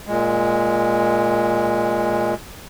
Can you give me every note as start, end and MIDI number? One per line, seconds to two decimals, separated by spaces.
0.07 2.34 46
0.07 2.34 56